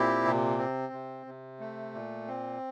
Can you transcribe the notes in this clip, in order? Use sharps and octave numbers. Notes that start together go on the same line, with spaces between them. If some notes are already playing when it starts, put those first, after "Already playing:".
Already playing: A#2 C4 E4 G4
C3
C4
C3
C3
A3
A#2
C4